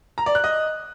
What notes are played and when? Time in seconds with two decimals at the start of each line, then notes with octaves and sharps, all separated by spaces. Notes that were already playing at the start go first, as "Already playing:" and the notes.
0.18 A#5
0.26 D5
0.35 F#6
0.44 D#5